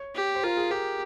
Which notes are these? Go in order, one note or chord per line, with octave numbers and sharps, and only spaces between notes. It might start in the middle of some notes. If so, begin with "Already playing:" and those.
Already playing: C#5
G4
C5
F4 A#4
G#4
G4 A#4